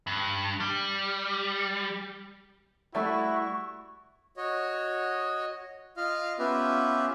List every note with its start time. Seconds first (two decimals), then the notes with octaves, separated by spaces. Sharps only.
0.07 G2
0.60 G3
2.95 G3 A3 E4 F#4 C#6
4.37 F#4 C#5 D#5
5.97 F4 D#5 F5 F6
6.39 B3 C#4 F4 G4 B4 E5